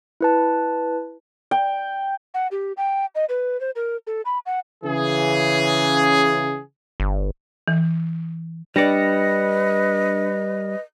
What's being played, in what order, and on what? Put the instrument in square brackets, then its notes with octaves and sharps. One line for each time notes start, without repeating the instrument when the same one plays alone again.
[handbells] E4 B4 A5
[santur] G5
[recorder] F#5
G4
G5
D#5
B4
C5
A#4
A4
B5
F#5
[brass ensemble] C#3 E3 G#4
[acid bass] G1
[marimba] E3
[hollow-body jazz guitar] G3 D5 [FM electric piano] D4 A#6 C#7 [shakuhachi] B4 [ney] D#5